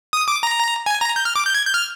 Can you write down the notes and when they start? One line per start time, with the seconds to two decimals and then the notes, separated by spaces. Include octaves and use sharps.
0.13 D#6
0.28 D6
0.43 A#5
0.86 G#5
1.01 A#5
1.16 G6
1.25 F6
1.36 D6
1.46 G6
1.54 G#6
1.65 G6
1.74 F6